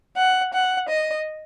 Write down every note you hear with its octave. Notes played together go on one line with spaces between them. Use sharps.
F#5
F#5
D#5